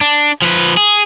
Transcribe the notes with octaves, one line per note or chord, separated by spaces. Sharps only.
D4
F3 B4
G#4